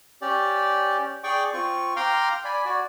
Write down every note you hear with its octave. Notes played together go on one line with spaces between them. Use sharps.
C#4 G4 D5
G#4 D5 G5 C#6 D6
C4 F4 C#6
F5 G5 A#5 C6 D6 F6
D5 G#5 B5
F#4 D5